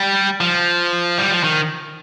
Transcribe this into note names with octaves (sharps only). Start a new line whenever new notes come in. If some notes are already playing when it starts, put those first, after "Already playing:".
Already playing: G3
F3
G3
F3
D#3